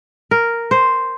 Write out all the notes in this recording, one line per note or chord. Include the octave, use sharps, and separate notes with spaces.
A#4
C5